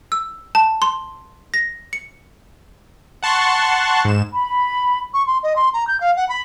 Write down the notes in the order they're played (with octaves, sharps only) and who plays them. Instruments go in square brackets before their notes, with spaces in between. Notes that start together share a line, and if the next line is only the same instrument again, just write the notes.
[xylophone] E6
A5
C6
A#6
C#7
[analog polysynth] F#5 A5 C6 C#6 F#6
G#2 E7
[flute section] B5
[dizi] C#6
C6
D#5
C6
A#5
G6
F5
F#5
B5